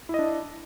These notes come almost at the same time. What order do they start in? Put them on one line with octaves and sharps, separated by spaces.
E4 D#5 D4